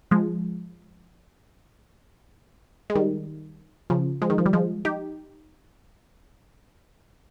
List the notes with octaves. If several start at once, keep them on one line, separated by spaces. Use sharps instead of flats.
F3 G#3
G#3
D#3 G3
C#3 F3
F3 G#3
D#3
F3
G3
F3 G#3
D#4 G4